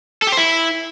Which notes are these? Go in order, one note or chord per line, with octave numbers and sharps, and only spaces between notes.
A4
G4
C5
E4